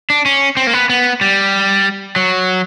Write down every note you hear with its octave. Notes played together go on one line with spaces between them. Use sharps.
D4
C#4
C4
A#3
B3
B3
G3
F#3